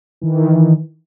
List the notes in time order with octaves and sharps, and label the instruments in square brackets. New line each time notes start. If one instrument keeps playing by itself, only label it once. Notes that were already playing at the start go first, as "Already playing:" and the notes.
[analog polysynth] D#3 E3